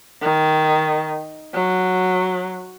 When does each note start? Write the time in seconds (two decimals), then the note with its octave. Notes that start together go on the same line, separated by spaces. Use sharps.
0.22 D#3
1.54 F#3